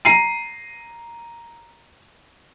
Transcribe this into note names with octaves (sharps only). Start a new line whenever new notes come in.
A#5 C7 D#7